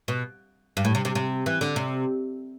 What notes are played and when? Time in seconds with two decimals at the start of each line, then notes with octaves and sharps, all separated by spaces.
0.08 B2
0.77 G2
0.85 A2
0.95 C3
1.05 C3
1.15 C3
1.46 E3
1.61 D3
1.76 C3